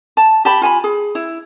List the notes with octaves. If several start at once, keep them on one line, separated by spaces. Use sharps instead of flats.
A5
G4 A5 B5
F4 G#5 B5
G#4
E4